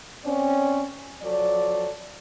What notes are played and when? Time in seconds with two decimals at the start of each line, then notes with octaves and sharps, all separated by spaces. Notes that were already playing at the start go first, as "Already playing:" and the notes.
0.25 C4 C#4 D5
1.22 F3 F#3 A4 D5